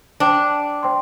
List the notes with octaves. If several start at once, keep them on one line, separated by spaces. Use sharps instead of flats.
D4 C5 G5 D6
C5 G5 C6